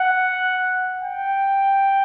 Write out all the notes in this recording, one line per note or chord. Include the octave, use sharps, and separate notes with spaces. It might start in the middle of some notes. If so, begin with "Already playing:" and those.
Already playing: F#5
G5